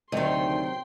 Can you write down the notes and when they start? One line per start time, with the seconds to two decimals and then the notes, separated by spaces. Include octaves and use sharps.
0.12 D2 C3 D#3 F#3 D#5 G5 C6